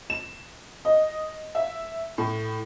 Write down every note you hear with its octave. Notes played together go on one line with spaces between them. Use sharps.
E7
D#5
E5
A2